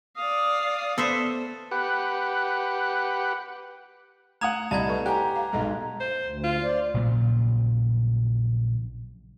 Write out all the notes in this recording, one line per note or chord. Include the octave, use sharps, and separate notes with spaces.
D5 F5 D#6
B3 A4 C5 E5
G4 B4 F#5
A3 F#5 A#5 D#6 G#6 F7
C2 D5 D#5 A5 A#5 G#6
A4 B4 C#6
G4 F#5 G#5 A#5 F#6
F5
B1 G#3 A4 D#5 F#5
C5
D2
F4
C5 D5
A#1 A#2 C#3 F#3